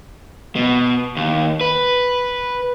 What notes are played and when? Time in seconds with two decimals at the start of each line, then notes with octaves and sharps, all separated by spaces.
0.56 B2
1.17 D#2
1.61 B4